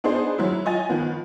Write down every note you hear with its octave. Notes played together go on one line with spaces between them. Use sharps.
B3 D4 D#4 G#4 C5
F#3 E4
C#5 D#5 G#5 A6
D#3 F3 B3